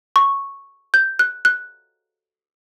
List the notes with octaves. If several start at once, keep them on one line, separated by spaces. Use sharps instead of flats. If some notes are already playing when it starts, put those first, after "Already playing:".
C#6
G6
F#6
F#6